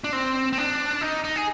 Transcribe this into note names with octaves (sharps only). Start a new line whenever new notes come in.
D4
C4
C4
D4
D#4
D#4
G#4